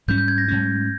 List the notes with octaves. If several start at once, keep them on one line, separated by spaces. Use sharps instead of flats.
G#2 G3 C#4 G6
G6
G#6
A#6
G#2 G3 C#4